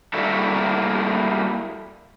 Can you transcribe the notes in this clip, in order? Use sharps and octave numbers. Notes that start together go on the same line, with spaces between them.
G3 A3 A#3 E4 F#4 A4